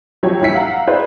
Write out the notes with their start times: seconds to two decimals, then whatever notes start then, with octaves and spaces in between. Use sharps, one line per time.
0.23 F3 F#3 G4 C#5
0.41 A#1 G3 E4 E6 B6 C#7
0.54 F5 F#5 A#5
0.87 E4 G#4 B4 C5 D5